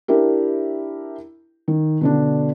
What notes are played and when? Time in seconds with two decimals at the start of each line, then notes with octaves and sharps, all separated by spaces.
0.08 D4 E4 G4 A#4
1.68 D#3
2.01 B2 D3 D4